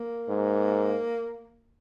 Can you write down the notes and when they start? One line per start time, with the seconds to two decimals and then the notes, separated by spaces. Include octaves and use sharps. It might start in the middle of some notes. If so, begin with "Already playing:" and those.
Already playing: A#3
0.29 G#2